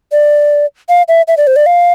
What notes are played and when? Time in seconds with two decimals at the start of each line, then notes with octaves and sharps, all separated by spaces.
0.12 D5
0.89 F5
1.08 E5
1.28 E5
1.37 D5
1.47 C5
1.56 D5
1.66 F5